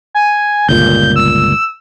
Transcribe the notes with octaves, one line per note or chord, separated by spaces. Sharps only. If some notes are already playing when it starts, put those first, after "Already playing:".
G#5
G1 C#2 A#2 G6
E6